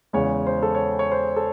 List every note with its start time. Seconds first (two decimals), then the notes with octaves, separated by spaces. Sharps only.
0.13 E2 C#3 G#3 C#5
0.47 C5
0.62 A4
0.75 C#5
0.99 C#5
1.12 C5
1.36 A4